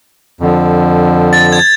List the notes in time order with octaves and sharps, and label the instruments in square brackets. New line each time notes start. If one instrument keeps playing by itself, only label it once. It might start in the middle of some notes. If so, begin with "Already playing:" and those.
[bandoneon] F2 D3 F3
[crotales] A6
G#6